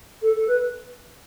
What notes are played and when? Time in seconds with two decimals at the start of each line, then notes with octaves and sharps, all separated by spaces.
0.22 A4
0.36 A4
0.47 B4